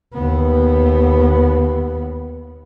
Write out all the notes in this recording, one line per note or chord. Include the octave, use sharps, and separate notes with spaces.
D#2 B3